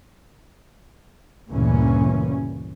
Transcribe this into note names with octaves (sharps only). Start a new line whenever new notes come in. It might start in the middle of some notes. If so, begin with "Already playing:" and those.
D2 G2 A#2 C#3 E3 C#4